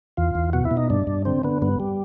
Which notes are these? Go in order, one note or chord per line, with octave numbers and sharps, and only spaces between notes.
E2 F4
E2
B2 F#4
E4
B2
D#4
G2 D4
G2
D3 C4
D3 B3
G2 B3
G3